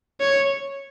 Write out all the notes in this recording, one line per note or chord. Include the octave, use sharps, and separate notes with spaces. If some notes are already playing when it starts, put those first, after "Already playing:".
C#5